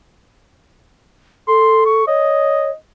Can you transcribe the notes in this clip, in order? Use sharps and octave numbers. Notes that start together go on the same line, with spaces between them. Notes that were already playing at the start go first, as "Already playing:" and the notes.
A4 C6
C#6
C#5 D#5